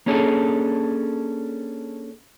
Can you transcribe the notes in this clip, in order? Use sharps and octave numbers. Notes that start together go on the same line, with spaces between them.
A#3 C#4 D4 G#4 A4